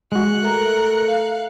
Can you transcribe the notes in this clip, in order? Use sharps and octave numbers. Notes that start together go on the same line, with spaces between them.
G#3 F#4 F#6 C#7
A3 A#4
F5